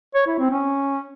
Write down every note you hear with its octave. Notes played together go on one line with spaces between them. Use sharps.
C#5
E4
C4
C#4